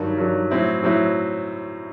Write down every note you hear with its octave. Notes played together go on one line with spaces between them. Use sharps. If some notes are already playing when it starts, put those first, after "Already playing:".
Already playing: G2 D#3 F#3
G2 D#3 F#3
A2 F#3 C4 E4
A2 F#3 C4 E4